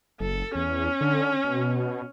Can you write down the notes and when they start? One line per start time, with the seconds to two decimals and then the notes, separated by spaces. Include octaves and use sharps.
0.20 F#1 A4
0.55 E2 C#4
1.01 D3
1.44 B2